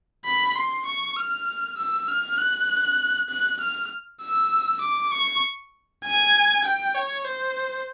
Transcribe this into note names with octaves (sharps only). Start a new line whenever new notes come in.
B5
C6
C#6
F6
E6
F6
F#6
F#6
F6
E6
D6
C#6
G#5
G5
C#5
C5